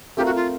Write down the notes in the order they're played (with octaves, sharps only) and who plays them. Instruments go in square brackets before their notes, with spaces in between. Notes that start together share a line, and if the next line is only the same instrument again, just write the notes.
[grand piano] A3 C4 F4 A#4 [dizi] G4
[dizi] F#4
F4